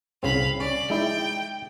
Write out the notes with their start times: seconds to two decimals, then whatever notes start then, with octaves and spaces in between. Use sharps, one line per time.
0.23 C2 C#3 C4 F5 B5
0.60 C#4 D5
0.90 G#3 D#4 E4 G5